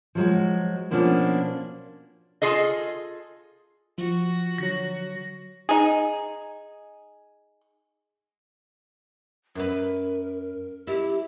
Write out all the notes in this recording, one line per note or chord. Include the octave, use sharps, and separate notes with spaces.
F3 F#3 G#3
B2 F3 A#3 C#4 D4
F4 G#4 A4 D#5
F3 F#4
D3 F#3 A#6
D#4 G#4
F#2 A#4 B4
E4 G4